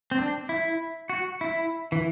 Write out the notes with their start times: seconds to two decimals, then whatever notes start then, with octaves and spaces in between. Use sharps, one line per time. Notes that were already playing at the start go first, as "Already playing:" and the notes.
0.11 C4
0.18 D4
0.49 E4
1.09 F#4
1.41 E4
1.92 E3